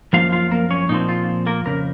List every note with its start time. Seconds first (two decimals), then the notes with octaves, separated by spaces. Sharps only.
0.13 F#2 F3 A#3 F4 F5
0.32 F4 F5
0.51 A#3 A#4
0.71 C#4 C#5
0.89 A#2 F3 C4 D#4
1.09 F4
1.46 A#3 A#4
1.66 F2 C#3 A#4